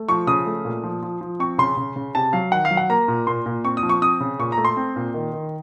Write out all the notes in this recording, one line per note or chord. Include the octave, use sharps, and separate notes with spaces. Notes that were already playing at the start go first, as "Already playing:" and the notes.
Already playing: A3
F3 C#6
C#3 D#6
A3
A#2
F3
F3
F3
C4 C#6
C#3 C6
C#3
C#3
C3 A5
F#3 F5
D#3 F#5
F5
F#3
F#5
A#3 A#5
A#2
A#2 C6
A#2
C4 C#6
D#6
F3
C#6
C4 D#6
C#3
A#2 C#6
A#5
A3
C6
C4
A#2
D#3
D#3